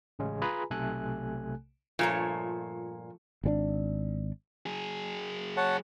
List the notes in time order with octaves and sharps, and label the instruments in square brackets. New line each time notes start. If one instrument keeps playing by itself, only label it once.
[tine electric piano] A1 C#3 G#3 C#4
F4 G#4 B4 G#5 A#5 B5
B1 C3 A3 A4 G#5 F#6
[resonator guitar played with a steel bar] G2 A#2 [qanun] F3 A3 C#5
[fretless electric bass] G#1 D3 D4
[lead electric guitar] F#3 G#4
[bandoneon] C#5 F#5 A5